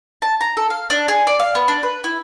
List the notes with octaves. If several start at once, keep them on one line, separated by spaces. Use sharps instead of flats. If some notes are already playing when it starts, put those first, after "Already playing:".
A5
A#5
A4
F5
D4
G#4
D5
F5
B3
D4
B4
E4